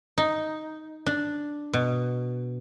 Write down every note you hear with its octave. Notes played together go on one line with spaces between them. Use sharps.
D#4
D4
B2